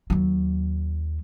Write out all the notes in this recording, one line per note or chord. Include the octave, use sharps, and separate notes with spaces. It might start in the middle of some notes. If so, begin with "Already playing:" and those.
D#2 F#3